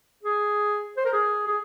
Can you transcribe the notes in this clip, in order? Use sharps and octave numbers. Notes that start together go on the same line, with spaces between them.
G#4
C5
A#4
G#4
G#4